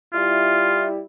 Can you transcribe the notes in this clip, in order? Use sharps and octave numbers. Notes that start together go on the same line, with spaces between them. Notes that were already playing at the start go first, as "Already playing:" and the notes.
G3 E4 F4